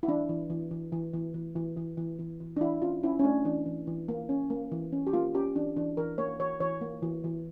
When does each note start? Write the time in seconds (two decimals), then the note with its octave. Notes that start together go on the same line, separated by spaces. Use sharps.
0.03 E4
0.08 E3 D4
0.29 E3
0.50 E3
0.71 E3
0.92 E3
1.14 E3
1.34 E3
1.56 E3
1.77 E3
1.97 E3
2.19 E3
2.40 E3
2.57 D4
2.61 E3 E4
2.82 C#4 F4
3.04 C#4 E4
3.19 C#4
3.24 A3 D4
3.45 E3 D4
3.66 E3
3.87 E3
4.08 A#3
4.29 C#4
4.50 A#3
4.72 E3
4.93 C#4
5.07 G4
5.13 A#3 F4
5.34 C#4 G4
5.55 E3 D4
5.76 E3 D4
5.97 E3 A#4
6.18 A#3 C#5
6.40 E3 C#5
6.60 E3 C#5
6.81 A#3
7.03 E3
7.24 E3